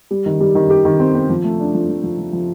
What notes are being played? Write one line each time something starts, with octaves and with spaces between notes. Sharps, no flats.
G3
D#3
G3
D#3
G4
D#3
C4
C4
F3
A3
D4
F3
F3
F3
F3
F3